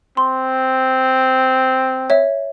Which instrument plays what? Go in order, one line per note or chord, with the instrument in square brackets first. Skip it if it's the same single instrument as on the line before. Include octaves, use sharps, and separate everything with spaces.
[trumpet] C4 [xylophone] C6
[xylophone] C#5 E5